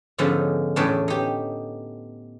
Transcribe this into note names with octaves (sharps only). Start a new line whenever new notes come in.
G#2 D3 F3 B3 C#4 D#4
E2 A2 B3 C#4 D4
D#4 G4